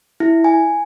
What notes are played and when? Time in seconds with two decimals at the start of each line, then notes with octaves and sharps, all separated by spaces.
0.20 E4
0.44 G#5